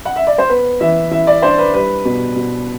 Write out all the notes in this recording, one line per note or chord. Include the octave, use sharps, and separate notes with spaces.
F#5
E5
D5
C5
B3 B4
E3 E5
E3 E5
D5
D4 C5
B4
G3 B4
B2
B2